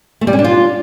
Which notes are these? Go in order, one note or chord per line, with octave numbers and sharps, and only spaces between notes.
A3
G3
C#4
D4
F4